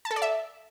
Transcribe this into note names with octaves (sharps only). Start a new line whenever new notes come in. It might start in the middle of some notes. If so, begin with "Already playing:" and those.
A5
A4
D5
E5